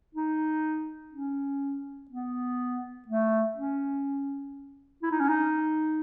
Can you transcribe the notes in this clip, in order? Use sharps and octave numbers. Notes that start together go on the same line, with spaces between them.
D#4
C#4
B3
A3
C#4
E4
D#4
C#4
D#4